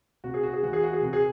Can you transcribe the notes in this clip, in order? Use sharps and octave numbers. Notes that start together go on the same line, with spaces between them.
C3 F#4
G#4
F#4
G#4
E3 F#4
G#4
F#4
G#4
C3 F#4
G#4